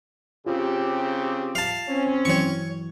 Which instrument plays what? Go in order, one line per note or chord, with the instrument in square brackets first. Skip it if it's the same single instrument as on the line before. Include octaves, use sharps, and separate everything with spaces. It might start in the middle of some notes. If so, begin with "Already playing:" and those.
[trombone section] C#3 C4 G4 [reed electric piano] F4
[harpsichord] F5 A5
[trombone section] C4 C#4
[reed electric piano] G2 E3 F#3 [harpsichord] C#5 C#6